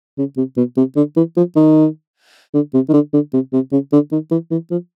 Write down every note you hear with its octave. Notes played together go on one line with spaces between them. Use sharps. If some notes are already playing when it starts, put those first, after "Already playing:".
C#3
C3
B2
C3
D3
E3
F3
D#3
D3
C3
D#3
D3
D3
C3
C3
C#3
D3
D#3
E3
E3
F3